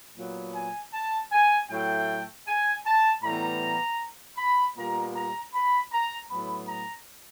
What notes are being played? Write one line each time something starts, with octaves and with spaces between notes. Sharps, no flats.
A#2 F#3 B3
G#5
A5
G#5
A2 F#3 A3 G5
G#5
A5
A2 E3 G3 B3 A#5
B5
A#2 G3 B3 A#5
A#5
B5
A#5
A2 F#3 B3 B5
A#5